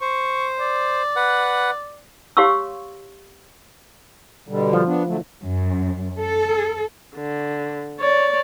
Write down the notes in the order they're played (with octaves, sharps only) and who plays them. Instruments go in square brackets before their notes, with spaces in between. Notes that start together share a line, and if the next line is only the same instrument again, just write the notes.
[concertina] C5 [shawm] C#6
[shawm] D5
[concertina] B4 F#5
[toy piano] G4 C#5 F5 C6 C#6 E6
[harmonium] B2 D3 G3
[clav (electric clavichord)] F3
[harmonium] B3 D4
D3 F#3 A3
[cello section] F#2
A4
[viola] D3
C#5 D5